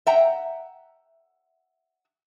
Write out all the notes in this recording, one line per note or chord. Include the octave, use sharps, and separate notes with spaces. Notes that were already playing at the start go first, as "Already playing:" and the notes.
E5 F#5 G5 A#5